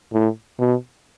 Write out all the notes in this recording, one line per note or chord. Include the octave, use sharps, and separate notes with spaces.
A2
B2